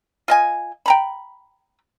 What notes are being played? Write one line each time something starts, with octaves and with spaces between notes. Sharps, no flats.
F4 D#5 G#5
G5 A#5 B5